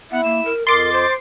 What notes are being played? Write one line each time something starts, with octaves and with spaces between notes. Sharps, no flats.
B3 E4 E5 F#5
A#3 E7
A#4
F2 A#4 D#5 C6 D6 A6 C7
C5